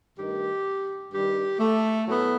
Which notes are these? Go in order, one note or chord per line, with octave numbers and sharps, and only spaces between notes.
G2 D#3 A3 G4
G2 D#3 G3 G4
A3
A2 F#3 A3 B3